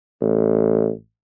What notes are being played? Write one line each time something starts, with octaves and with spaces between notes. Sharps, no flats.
A1